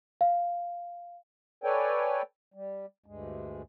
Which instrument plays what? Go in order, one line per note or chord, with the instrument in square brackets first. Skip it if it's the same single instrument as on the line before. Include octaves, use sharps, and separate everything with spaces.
[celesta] F5
[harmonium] A4 B4 C#5 D5 G5 G#5
G3
D2 G2 G#3